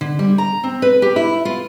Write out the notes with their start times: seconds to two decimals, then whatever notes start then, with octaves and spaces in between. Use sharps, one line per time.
0.01 D3
0.19 G3
0.38 A#5
0.64 C4
0.82 B4
1.02 G4
1.16 E4
1.45 F4